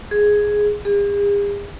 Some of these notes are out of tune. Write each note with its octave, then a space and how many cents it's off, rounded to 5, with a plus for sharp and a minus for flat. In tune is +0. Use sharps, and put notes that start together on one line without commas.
G#4 +0
G#4 -45